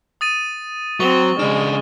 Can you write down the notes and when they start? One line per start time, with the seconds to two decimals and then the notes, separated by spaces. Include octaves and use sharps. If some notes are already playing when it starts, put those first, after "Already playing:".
0.21 D#6 A6 D#7
1.00 F#3 C4 C#6 G7
1.39 C#3 G#3 D4 F6